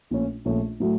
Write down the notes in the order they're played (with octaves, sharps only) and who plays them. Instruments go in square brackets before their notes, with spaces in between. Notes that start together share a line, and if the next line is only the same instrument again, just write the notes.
[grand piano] A#1 A#2 A3 C#4
A#1 A#2 A3 C#4
A2 F#3 A3